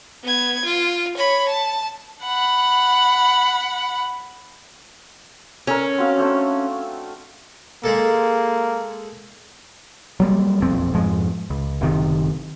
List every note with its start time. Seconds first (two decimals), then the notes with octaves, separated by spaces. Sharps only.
0.23 B3 G#6
0.65 F4
1.17 C#5 B5
1.48 A5
2.24 F#5 B5
5.67 C#4 A4 A#4
5.98 C4 F#4 F5
6.17 A3 C4 D4
7.84 G#3 A#3 A4
10.20 F#3 G3 A#3
10.61 E1 A#1 F2 C4
10.94 F2 G#2 F3 G#3
11.50 C#2
11.81 F#1 C3 D#3